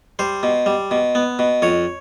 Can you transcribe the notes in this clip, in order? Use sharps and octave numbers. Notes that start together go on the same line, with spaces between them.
G3 C5
B2
G3
B2
B3
B2
F2 C#5